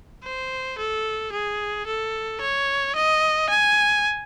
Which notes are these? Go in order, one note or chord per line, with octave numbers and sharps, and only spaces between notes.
C5
A4
G#4
A4
C#5
D#5
G#5